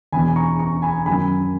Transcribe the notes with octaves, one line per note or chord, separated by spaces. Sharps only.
E1 E2 B2 G#5 B5
A#5 C#6
A#5 C#6
G#5 B5
F#2 D#3 F#3 G#5 B5